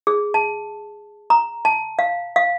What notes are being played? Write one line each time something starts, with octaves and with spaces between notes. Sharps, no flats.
G#4
A5
A#5
A5
F5
F5